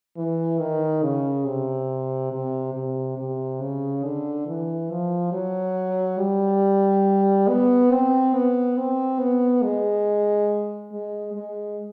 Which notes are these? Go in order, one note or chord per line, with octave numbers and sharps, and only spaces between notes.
E3
D#3
C#3
C3
C3
C3
C3
C#3
D3
E3
F3
F#3
G3
B3
C4
B3
C4
B3
G#3
G#3
G#3